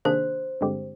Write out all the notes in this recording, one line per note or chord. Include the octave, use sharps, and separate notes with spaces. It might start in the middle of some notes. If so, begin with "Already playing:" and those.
C3 D#3 A#3 D4 G#4 C5
G2 D3 G#3 C4 G4